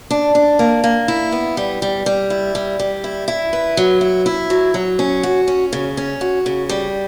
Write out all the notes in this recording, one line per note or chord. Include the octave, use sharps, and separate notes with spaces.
D4
D4
A#3
A#3
E4
B3
G3
G3
G3
E4
G3
G3
E4
E4
B4
F#3
E4
E4
F#3
F#3
C#4
F#4
C#4
C#3
C#4
F#4
C#3
G3